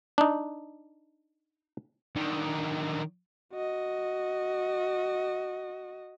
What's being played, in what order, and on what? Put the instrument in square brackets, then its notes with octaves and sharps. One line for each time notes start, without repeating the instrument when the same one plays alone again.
[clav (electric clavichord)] D4 D#4
[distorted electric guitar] D3 D#3
[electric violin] F#4 D#5